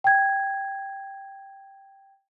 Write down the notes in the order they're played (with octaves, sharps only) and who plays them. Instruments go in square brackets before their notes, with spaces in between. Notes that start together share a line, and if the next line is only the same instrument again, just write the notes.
[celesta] G5 G#6